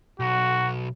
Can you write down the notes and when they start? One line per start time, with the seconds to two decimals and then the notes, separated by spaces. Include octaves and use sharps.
0.20 B1 F#4